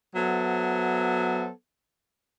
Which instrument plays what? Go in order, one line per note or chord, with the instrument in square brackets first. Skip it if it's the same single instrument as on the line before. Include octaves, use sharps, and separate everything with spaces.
[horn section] F#3 B3 A4 C5 E5